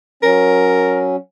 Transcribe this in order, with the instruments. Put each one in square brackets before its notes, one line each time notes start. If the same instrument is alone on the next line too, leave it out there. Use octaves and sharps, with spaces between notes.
[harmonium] F#3 C#4 [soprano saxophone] A#4